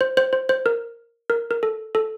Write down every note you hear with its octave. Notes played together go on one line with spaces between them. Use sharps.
C5
C5
C5
C5
A#4
A#4
A#4
A4
A4